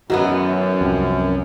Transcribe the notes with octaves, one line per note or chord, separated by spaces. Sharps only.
F#2 D#3 E3 B3 F#4
C2 F2